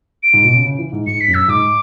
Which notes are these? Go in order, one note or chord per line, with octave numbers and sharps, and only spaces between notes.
D7
G#2
B2
C#3
C#3
E3
G#2
G#2 C#7
B6
F#2
E6
G#2 D6